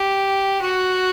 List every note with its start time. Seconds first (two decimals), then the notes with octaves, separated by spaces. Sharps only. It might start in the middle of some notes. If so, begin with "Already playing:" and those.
Already playing: G4
0.61 F#4